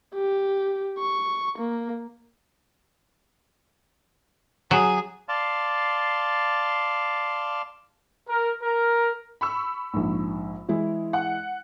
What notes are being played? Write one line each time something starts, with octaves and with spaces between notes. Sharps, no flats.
G4
C#6
A#3
F#3 G#4
D5 F5 A5 C6
A#4
A#4
B5 C#6 E6
A#1 G#2
E3 G#3 E4
F#5